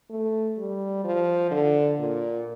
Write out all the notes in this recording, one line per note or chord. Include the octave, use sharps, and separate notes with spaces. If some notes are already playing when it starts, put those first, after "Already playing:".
A3
G3
F3
D3
A#2